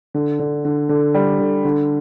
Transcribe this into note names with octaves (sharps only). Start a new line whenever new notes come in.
D3
D3
D3
D3
G3
D3
D3